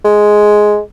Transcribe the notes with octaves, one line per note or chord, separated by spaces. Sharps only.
G#3